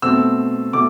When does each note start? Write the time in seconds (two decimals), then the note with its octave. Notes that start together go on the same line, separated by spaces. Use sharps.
0.02 B2 A3 C4 E6
0.73 B2 A3 D6